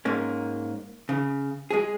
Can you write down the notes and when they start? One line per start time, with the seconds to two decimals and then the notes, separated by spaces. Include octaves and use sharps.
0.05 G#2 A#3 C#4
1.09 C#3
1.71 G#3 G#4